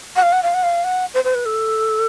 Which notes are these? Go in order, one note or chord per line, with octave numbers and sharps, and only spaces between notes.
F#5
F5
F#5
F5
F#5
F5
F#5
C5
C5
B4
A4